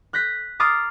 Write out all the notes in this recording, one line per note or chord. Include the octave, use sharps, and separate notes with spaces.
F#6 G6 A#6 B6
A#5 C6 D6 D#6 F6 A6